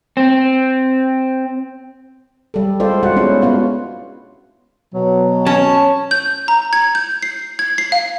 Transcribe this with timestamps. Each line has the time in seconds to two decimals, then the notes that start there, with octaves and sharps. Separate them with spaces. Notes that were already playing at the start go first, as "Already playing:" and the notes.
0.17 C4
2.54 G3 A4
2.80 G#3 F4 A4 C5 D5
3.03 G#3 F4 F#4 F#5
3.16 G#3 B3 C#4 D4 E4 F#4
3.42 G#3 B3 F4 F#4
4.95 B2 F#3
5.47 C#4 A5
6.11 G6
6.48 A#5
6.73 G#6
6.95 G6
7.23 C7
7.59 G#6
7.78 C7
7.92 F5